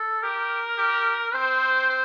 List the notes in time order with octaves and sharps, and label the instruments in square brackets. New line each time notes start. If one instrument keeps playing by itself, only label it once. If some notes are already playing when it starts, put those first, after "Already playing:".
Already playing: [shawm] A4
[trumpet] G4 [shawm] A#4
[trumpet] G4
[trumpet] C4 [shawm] C5
[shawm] C5